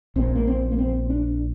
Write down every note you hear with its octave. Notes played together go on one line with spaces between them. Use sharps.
A#1 A#2 C4
A#3
C4
A#3
C4
D4